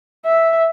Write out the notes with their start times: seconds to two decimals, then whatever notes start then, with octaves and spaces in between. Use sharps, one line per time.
0.25 E5